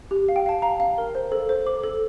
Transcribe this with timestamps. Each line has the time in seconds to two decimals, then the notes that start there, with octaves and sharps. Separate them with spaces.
0.11 G4
0.29 F5
0.36 G5
0.46 F5 A5
0.62 F5 A#5
0.80 F5
0.98 A#4
1.15 C5
1.32 A4
1.49 C5
1.67 A4 D6
1.84 A4